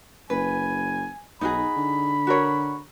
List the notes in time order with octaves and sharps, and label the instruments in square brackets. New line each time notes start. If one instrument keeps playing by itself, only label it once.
[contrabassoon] F#1 [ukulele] B4 [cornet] G#5
[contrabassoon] B1 [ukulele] D#4 F#4 G#4 [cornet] B5
[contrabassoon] D3
[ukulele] F#4 A#4 C#5